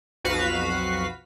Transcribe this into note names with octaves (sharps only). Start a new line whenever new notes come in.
B1 F2 F#4 B4 F5 B6